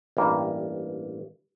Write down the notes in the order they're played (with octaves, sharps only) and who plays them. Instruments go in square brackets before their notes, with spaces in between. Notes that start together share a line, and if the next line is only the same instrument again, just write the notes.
[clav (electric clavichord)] A1 G2 A#3